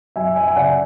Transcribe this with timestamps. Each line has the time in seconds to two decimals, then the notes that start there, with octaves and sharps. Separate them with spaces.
0.16 F#2 E5 G#5
0.36 E5 G#5
0.48 G#5
0.56 C#3 D5 F#5